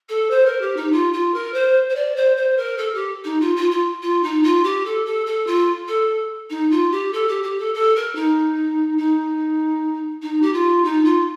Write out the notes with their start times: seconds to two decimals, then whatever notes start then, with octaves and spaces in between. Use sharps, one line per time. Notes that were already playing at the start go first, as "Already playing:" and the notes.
0.09 A4
0.30 C5
0.46 A#4
0.61 G4
0.76 D#4
0.92 F4
1.13 F4
1.34 A#4
1.54 C5
1.89 C5
1.95 D5
2.16 C5
2.37 C5
2.57 A#4
2.78 A4
2.94 G4
3.24 D#4
3.40 F4
3.56 F4
3.71 F4
4.02 F4
4.23 D#4
4.43 F4
4.63 G4
4.85 A4
5.05 A4
5.26 A4
5.47 F4
5.88 A4
6.50 D#4
6.71 F4
6.92 G4
7.13 A4
7.28 G4
7.43 G4
7.59 A4
7.74 A4
7.95 A#4
8.15 D#4
8.98 D#4
10.22 D#4
10.42 G4
10.53 F4
10.84 D#4
11.04 F4